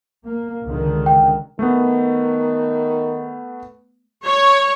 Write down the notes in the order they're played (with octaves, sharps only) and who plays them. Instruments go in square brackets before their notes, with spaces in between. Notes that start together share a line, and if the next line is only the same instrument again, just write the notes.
[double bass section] A#3
C#2 D3 D#3
[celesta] G5
[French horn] D#3 [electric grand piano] A3 B3
[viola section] C#5